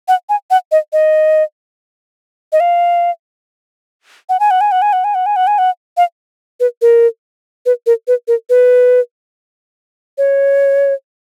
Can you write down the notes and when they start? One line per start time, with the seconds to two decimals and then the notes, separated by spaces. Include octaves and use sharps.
0.08 F#5
0.29 G#5
0.51 F#5
0.72 D#5
0.93 D#5
2.52 D#5
2.60 F5
4.29 F#5
4.40 G#5
4.51 F#5
4.61 G#5
4.72 F#5
4.82 G#5
4.93 F#5
5.04 G#5
5.15 F#5
5.26 G#5
5.36 F#5
5.47 G#5
5.58 F#5
5.97 F5
6.60 B4
6.82 A#4
7.66 B4
7.86 A#4
8.08 B4
8.28 A#4
8.50 B4
10.18 C#5